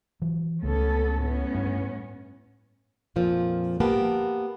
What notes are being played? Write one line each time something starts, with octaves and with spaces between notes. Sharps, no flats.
E3 F#3
C#2 A3 B3 C#4 A4
A2 B3 C#4
G2
F2 A#2 F3
A#3 B3 G4 A5